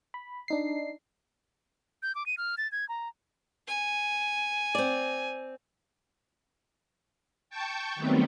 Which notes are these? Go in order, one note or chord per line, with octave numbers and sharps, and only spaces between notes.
B5
D4 D#4 C7
G6
D6
D#7
F6
A6
G#6
A#5
G#5
C4 D5
G5 A5 C#6 G6
D#3 F#3 G3 A3 B3 C4